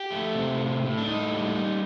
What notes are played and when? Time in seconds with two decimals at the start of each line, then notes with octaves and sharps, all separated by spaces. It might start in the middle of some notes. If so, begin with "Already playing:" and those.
Already playing: G4
0.11 A3
0.35 C3
0.59 A2
0.83 A2
0.98 D4
1.07 A2 D#4
1.31 G3